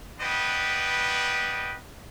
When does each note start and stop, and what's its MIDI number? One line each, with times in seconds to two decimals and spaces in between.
0.21 1.77 59
0.21 1.77 62
0.21 1.77 71
0.21 1.77 75
0.21 1.77 79